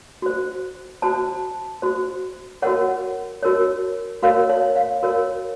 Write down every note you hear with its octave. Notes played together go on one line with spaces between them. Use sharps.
F#4 C5
F#4 C5 A5
F#4 C5
F#4 A#4 C#5 F#5
F#4 A#4 C#5
F#4 A#4 C#5 F5
C#5
F5
F#4 A#4 C#5